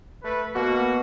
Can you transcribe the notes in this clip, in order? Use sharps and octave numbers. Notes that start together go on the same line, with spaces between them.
A3 B4
B2 A#3 F#4